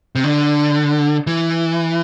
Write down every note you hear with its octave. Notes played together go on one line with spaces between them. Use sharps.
C3
D3
E3